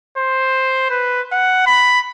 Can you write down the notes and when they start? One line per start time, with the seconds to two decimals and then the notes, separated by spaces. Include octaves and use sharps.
0.18 C5
0.90 B4
1.32 F#5
1.67 B5